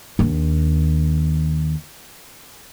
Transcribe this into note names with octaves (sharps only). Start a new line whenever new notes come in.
D#2 D4